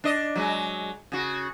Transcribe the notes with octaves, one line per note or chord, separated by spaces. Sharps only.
D4 D#5
F#3 G#3
C#3 F#4